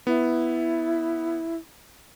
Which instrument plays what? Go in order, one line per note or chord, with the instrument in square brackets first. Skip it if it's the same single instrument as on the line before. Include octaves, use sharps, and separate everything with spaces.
[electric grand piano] B3 [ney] E4